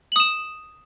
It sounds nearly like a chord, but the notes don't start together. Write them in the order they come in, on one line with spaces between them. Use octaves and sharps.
F#7 D#6 E7